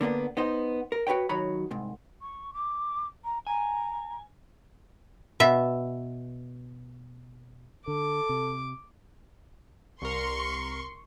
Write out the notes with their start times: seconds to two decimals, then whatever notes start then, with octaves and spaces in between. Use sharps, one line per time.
0.01 D3 A#3 B3 D4
0.37 B3 D#4 C5
0.92 A#4
1.07 F#4 G4 B4 C#5 G5
1.29 D#3 F#3 F#4 C#5 A#5 B5
1.71 C2 G#2
2.21 C#6
2.53 D6
3.24 A#5
3.47 G#5 A#5
5.40 B2 E5
7.88 D3 A4 D6
8.29 C3
10.02 C2 A#4 C6 C#6